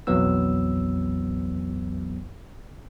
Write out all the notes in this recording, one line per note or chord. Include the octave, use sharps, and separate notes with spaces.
B1 F2 E3 F#3 B3 E6